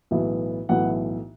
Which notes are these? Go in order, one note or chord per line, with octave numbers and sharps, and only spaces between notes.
B1 A2 E3 B3 E4
B1 A2 E3 B3 E4 F#5